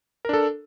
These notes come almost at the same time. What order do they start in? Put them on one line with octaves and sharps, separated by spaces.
A#4 D4 A4